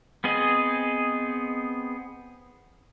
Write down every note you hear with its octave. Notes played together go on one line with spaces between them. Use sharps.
B3 C4 G#4 D#5